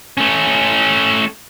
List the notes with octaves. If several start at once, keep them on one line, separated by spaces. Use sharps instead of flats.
A3 C#4